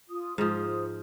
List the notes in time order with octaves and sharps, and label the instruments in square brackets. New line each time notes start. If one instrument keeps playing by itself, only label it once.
[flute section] F4 D#6
[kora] G#2 F3 [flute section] C5 D#6